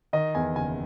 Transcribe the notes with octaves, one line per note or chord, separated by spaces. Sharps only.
D#3 D#5
E2 G#5
F#1 G#5